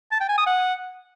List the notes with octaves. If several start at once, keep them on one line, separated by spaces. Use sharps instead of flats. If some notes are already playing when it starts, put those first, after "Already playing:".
A5
G5
G#5
D#6
F#5